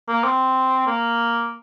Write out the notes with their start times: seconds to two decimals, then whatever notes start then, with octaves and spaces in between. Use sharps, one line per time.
0.08 A#3
0.24 C4
0.87 A#3